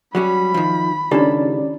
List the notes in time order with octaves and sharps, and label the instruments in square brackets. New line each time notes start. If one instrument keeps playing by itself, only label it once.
[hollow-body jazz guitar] F#3 G3 C#4 [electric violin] B5
[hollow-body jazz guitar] D#3 F3
[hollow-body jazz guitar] C#2 D#3 A4 [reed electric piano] C#4 D5 [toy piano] D4 E4 G4